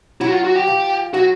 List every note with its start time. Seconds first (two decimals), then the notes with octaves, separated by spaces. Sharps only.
0.21 F#3 E4
0.27 F#4
0.32 F4
0.44 F#4
0.56 G4
0.67 F3
1.14 F#3 F#4